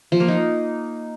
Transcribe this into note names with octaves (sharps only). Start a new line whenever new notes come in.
F3
A#3
D#4